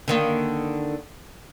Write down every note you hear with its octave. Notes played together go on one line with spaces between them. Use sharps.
D3 D#3 A#3